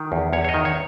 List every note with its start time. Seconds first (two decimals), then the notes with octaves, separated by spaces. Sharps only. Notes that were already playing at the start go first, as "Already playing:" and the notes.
Already playing: D#3
0.12 E2
0.33 E2 C#5
0.44 C#5
0.49 D#5
0.54 D#3
0.65 C#5